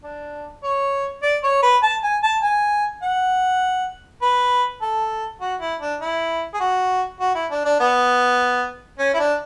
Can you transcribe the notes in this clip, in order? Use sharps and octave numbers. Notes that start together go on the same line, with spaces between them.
D4
C#5
D5
C#5
B4
A5
G#5
A5
G#5
F#5
B4
A4
F#4
E4
D4
E4
G#4
F#4
F#4
E4
D4
D4
B3
C#4
E4
D4